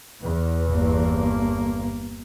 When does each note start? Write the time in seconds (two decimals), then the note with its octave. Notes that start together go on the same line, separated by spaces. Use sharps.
0.23 E2
0.69 G1 A#3